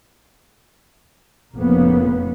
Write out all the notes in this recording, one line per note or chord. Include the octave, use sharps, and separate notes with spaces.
F1 F2 C#3 A#3 B3